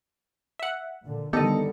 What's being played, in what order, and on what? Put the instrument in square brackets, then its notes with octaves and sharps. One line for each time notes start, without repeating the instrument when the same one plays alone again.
[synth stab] E5 F#5
[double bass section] A#2 D3
[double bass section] D3 D#3 G3 [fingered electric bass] B3 [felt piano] D#4 A4 [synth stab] G4 D#5